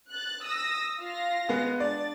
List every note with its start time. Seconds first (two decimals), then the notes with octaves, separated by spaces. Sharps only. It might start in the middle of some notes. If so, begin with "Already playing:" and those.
0.11 F#6 A6
0.45 D#6 E6 A#6
0.99 F4 F5 A#6
1.49 G#3 B3 G#4
1.80 D4 D5 A6